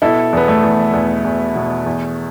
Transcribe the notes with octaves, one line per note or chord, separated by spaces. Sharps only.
B2 E4 A4
E2 B3
A3
E2
E2
E2
B2
E2